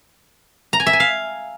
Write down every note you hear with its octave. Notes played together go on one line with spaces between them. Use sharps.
A#5
G#5
E5
G#5
F5